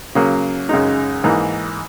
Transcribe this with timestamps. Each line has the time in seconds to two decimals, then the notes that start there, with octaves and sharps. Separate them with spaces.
0.15 C#3 F#3 A#3
0.69 F#2 C#3 G#3 D#4
1.24 G#2 E3 A#3 D#4